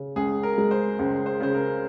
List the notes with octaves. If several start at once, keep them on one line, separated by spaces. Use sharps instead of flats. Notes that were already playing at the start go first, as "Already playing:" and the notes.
Already playing: C#3
C#2 G#4
A#4
G#3
C5
C#2 C5
C5
C#3 C5
A#4